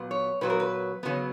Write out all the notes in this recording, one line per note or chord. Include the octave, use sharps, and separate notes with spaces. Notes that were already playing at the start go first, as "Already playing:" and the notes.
Already playing: A#2 F#3 B3
C#5
A#2 F#3 B3 B4
A#4
B4
C#3 F#3 B3